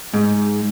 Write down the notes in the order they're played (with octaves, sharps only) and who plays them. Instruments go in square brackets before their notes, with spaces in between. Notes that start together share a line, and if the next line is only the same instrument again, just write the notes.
[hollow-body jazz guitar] G#2